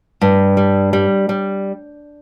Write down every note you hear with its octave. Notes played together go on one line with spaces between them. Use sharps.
G2
G3
G3
G3